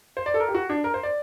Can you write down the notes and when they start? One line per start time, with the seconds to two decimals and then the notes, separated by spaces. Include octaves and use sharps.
0.17 C5
0.26 D5
0.34 A4
0.40 A#4
0.48 G4
0.54 F#4
0.69 D4
0.84 A#4
0.94 C5
1.03 D5